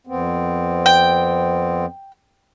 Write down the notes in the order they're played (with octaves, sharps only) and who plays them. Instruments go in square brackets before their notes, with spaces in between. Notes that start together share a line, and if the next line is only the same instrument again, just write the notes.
[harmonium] F2 B3 C4
[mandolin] G5